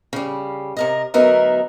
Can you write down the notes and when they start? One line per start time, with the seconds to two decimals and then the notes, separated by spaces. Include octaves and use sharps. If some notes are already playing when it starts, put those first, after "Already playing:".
0.13 C#3 G3
0.77 C3 A#4 D#5
1.14 D2 F#3 B3 D#4 A#4 E5